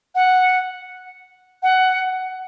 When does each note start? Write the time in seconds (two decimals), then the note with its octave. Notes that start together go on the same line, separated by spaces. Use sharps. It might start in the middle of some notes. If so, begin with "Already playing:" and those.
0.15 F#5
1.63 F#5